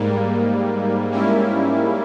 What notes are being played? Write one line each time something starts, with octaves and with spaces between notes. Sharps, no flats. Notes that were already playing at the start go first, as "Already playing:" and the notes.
Already playing: G#2 G3 A#3
G#2 G3 A#3 C#4 E4